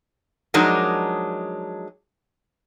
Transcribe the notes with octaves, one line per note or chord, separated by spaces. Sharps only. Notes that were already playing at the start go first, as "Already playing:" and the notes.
F3 F#3 G#3 D4 D#4 A#4